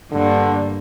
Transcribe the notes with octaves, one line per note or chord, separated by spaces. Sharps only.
G2 D3 A#3